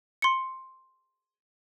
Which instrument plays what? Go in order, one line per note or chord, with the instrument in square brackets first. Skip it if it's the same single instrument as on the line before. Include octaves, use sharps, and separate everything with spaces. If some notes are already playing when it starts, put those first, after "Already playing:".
[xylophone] C6 C#7